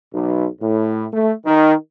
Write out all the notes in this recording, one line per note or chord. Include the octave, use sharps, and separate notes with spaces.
B1
A2
A3
D#3